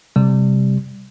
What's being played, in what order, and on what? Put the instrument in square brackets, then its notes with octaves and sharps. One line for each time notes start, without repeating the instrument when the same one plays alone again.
[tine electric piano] C3 G3